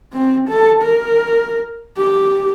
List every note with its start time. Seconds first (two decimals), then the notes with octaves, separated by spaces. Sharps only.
0.13 C4
0.49 A4
0.83 A#4
1.98 G4